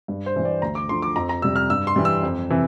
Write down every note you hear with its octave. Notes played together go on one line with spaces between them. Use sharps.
G2
C5
E3 G3
D5
D2 A#5
D6
D3 F3 C6
D6
F2 A#5
A#5
C3 G3 E6
F6
G2 E6
C6
E3 G3
E6
F2
C3 E3